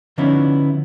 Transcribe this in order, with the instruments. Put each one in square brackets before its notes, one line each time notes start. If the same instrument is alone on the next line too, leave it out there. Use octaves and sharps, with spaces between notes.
[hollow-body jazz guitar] D3 F3 B3 C#4 D#4 E4